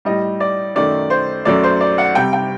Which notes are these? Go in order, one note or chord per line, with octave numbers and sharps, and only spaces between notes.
A2 G3 D#5
D5
F#2 D#3 A3 D5
C5
F#2 F#3 A3 D5
C5
D5
F#5
C3 G3 G5
G5